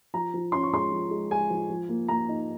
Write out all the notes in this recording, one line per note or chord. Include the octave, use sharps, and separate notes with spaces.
F3 A#5
F3
C#4 C6
C#6
G#3 C6
F3
G#3
G#3 G#5
F3
F3
A#3
A#3 A#5
D#4